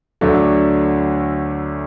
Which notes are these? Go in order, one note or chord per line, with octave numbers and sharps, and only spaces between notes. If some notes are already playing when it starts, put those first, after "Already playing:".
D2 D3 F#3 A3 D4